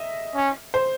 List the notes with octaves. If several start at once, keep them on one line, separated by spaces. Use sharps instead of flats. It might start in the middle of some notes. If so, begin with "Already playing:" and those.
Already playing: D#5 E5
C#4
C5